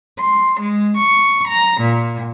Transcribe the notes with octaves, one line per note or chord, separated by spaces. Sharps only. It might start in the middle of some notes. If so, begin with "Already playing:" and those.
C6
G#3
C#6
A#5
A#2